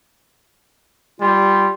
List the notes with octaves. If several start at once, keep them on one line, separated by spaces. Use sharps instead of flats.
G3 F4